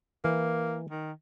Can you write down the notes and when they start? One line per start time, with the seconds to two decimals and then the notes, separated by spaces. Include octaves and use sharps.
0.24 E3 A#3
0.90 D#3